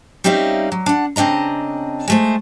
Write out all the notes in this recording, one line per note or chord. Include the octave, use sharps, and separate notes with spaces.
G3 C4 C#4 D#4 E5 F5
F#3
D4 F#5
C#3 C4 D4 D#5 A#5
G#3 A3 C5